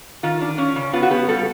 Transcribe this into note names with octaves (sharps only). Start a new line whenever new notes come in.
D#3 F4
D4
C#4
C#3
B3 F4
F#4
B3 G4
G3 A4